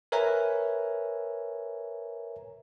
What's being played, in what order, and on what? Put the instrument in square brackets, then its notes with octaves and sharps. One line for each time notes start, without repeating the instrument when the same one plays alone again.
[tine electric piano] A#4 B4 C#5 E5 G#5 A#5